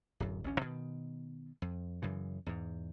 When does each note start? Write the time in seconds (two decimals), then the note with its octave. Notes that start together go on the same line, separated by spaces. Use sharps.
0.20 D1 F#2
0.44 A1 D2 C#4
0.61 B2 D#3
1.62 F2
2.02 F#2 C#3 E3
2.46 E2 G#2